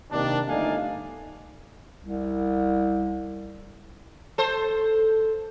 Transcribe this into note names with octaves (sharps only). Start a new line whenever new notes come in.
C3 D#3 A#3 D4
G1 A3 D#4 D5 F5 G#5
C2
A4 C5